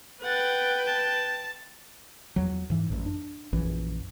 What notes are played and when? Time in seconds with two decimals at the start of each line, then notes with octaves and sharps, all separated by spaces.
0.22 B4 F#5 G5 A6
0.86 A5
2.36 E2 F#3
2.70 G#2 E3
2.90 A1 F#2
3.06 D4
3.53 A#1 F#2 E3